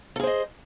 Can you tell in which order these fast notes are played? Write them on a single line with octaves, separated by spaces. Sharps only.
A4 G#4 C5 D#5